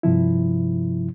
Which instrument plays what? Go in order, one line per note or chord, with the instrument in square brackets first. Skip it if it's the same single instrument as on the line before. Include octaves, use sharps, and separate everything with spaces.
[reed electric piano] G2 C3 F3 E4